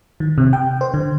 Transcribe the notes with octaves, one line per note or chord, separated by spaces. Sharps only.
D#3
C3
G5
C5
D3